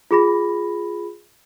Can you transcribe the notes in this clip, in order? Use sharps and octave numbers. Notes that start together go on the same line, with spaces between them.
F4 G#4 B5 A#6